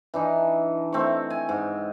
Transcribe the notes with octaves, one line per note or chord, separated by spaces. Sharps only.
E3 D4 D#4
A3 C4 F5 C#6
G#5
G#2